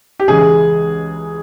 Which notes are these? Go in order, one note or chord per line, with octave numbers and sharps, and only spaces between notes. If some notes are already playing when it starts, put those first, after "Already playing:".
G4
C#2 C#3 E3 G#3 G#4